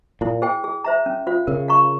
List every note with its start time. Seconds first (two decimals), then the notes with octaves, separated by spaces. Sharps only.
0.21 A#2 E4
0.42 G#4 C5 G5
0.64 G#4
0.84 C5 E5 A#5
1.06 C#4
1.27 F4 C5 F5
1.47 C#3 A#4
1.68 F5 A#5 C#6